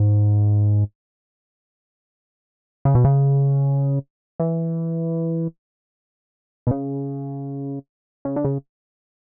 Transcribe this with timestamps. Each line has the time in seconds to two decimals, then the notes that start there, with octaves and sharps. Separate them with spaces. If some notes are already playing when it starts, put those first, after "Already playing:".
Already playing: G#2
2.85 C#3
2.95 B2
3.04 C#3
4.40 E3
6.67 B2
6.71 C#3
8.25 C#3
8.36 D3
8.45 C#3